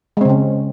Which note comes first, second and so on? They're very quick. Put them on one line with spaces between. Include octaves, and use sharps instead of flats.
G#3 C4 C#3 C#4